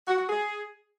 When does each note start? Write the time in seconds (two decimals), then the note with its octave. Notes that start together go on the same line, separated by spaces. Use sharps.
0.08 F#4
0.18 F#4
0.29 G#4